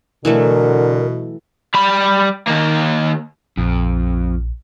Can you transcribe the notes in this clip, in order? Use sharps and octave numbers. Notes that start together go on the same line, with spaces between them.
B2 D3 E3 F#3 A3 A#4
G3 B5
D#3 A#3
A#1 F2